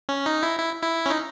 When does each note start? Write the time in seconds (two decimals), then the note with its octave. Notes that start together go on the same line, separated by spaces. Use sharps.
0.09 C#4
0.26 D#4
0.43 E4
0.59 E4
0.82 E4
1.06 C#4
1.10 D#4